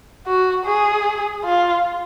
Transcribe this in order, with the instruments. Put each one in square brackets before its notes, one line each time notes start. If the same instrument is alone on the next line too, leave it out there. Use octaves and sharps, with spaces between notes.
[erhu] F#4
G#4
F4